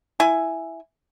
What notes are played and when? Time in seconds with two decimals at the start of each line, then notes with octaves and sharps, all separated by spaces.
0.20 E4 G#5